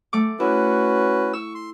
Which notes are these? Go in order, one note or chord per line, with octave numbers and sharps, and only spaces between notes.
A3 D6
C#4 E4 F#4 B4
C#6 E6
C6